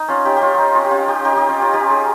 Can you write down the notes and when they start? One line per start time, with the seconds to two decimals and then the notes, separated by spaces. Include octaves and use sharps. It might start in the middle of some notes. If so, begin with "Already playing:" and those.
Already playing: D#4
0.08 C#4 F4
0.25 D#4 G4
0.36 G4
0.41 C#4 F4
0.54 D#4 F4
0.75 C#4 F4
0.84 G4
0.91 C#4 F4
1.08 D#4 G4
1.25 D#4 G4
1.36 D#4 G4
1.49 C#4 F4
1.61 C#4 F4
1.73 D#4 G4
1.90 F4 G#4